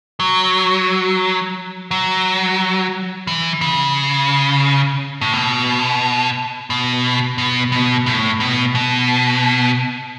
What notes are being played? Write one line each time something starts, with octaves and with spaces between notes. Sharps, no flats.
F#3
F#3
E3
C#3
A2
B2
B2
B2
B2
A2
B2
B2